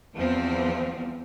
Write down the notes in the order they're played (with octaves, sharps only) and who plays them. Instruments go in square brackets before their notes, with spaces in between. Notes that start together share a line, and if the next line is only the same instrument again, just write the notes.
[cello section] E2 E3 F3 G3 B3 C4